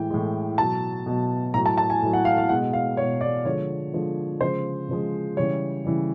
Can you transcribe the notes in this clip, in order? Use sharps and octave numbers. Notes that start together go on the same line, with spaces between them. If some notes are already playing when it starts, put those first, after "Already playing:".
Already playing: A2 E3 G#3 G5
A2 E3 G#3
B2 F#3 A5
B2 F#3
A2 F#3 A#5
A5
A5
G#5
A2 F#3
F#5
F5
F5
B2 G#3 F#5
F5
B2 G#3 C#5
D5
D3 F3 G#3 C#5
D3 F3 G#3
C#3 F3 G#3 C5
C#3 F3 G#3
C#3 E3 G3 C#5
C#3 E3 G3